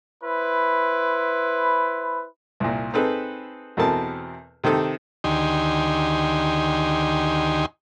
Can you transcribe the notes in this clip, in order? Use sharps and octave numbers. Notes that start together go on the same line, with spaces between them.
E4 B4 C5
C2 A#2
C4 D#4 G#4 A4 B4
E2 B2 C4 A4 A#4 A5
C3 D#3 C4 A4
D2 D#3 D#4 G4 G#5 C6